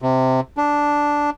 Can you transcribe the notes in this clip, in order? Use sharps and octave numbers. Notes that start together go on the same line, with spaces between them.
C3
D4